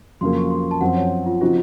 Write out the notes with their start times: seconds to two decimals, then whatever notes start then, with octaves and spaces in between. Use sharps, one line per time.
0.21 F2 C#3 F#3 A#3 C6
0.36 C#6
0.51 C6
0.71 A5
0.81 F#2 F3 C4 F#5
0.96 C#5
1.26 F4
1.41 C#3 F3 C4 D#4 F4 F#4